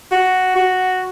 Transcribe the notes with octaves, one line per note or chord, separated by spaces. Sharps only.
F#4
F#4